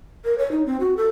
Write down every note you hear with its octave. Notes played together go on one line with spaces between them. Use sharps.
A#4
C#5
D#4
C4
F#4
A4